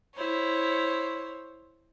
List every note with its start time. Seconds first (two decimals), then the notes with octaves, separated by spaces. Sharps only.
0.15 E4 C5 C#5